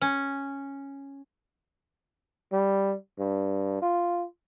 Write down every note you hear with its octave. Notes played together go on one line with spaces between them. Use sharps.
C#4
G3
G2
F4